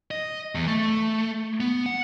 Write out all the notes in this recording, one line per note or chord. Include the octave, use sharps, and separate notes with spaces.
D#5
E2
A3
B3
F#5